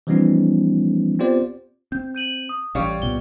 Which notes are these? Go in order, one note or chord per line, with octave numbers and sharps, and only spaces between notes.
E3 F3 G3 B3 C#4 D#4
B3 C4 F4 G4 C5 D5
C4 G6
G6 D#7 F#7
D#6
A1 G3 C#5 F5
C2 A#2 B3 G7